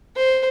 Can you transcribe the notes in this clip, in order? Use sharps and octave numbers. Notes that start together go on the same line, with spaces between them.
C5